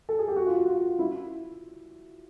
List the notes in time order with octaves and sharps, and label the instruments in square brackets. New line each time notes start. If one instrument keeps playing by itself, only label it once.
[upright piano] A4
G#4
G4
F#4
F4
F#4
F4
E4